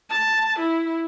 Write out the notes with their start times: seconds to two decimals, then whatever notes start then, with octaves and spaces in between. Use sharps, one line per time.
0.10 A5
0.59 E4